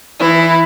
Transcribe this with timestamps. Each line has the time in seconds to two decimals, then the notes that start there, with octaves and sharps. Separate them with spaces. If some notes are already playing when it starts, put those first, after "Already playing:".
0.19 E3 E4